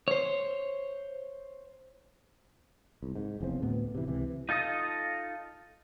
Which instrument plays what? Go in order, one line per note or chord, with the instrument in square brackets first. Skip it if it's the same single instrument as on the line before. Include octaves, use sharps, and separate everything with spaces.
[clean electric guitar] C5 C#5
[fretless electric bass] C2
G#2
F1 E2 C#3 C4
D2 A2 B3
C3 E3
C#2 C3 E3
[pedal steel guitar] D#4 F4 A4 D#5 D#6